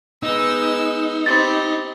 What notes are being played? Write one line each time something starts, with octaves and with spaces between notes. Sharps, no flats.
G#3 B3 D#4 E6
C4 G4 B5 A6